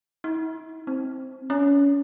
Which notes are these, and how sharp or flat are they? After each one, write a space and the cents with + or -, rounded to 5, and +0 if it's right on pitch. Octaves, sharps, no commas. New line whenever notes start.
E4 -45
C4 +10
C#4 +30